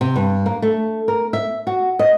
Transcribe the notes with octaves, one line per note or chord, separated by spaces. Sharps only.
C3
G2
A#3
A3
A#4
E5
F#4
D#5